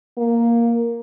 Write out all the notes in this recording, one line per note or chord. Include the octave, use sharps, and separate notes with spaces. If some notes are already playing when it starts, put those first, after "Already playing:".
A#3